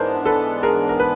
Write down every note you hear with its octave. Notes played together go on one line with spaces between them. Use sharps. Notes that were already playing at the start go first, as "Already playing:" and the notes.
Already playing: G#2 E3 G#3 B3 D4 A#4 C5
A4 B4
G#4 A#4
A#4
B4